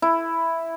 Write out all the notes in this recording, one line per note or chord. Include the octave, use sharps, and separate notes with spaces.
E4